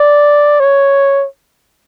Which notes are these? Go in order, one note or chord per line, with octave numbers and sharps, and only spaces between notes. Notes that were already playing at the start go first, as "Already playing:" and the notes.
Already playing: D5
C#5